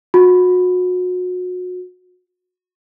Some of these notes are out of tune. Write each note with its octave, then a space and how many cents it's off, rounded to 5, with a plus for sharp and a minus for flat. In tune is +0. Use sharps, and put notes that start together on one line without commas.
F#4 -30